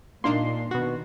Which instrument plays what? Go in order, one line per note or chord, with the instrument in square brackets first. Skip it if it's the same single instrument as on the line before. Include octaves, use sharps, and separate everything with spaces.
[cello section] A#2 [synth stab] A#3 D4 D#4 [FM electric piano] C6
[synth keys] B2 F#4 [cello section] D#3